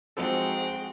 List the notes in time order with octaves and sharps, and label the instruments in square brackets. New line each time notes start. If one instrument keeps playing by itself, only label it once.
[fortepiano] F3 D#4 A4 [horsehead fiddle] G#3 F#4 [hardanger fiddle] C4